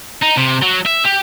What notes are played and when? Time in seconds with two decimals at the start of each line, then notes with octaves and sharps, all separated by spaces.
0.22 D#4
0.37 C3
0.62 F#3
0.85 E5
1.04 G4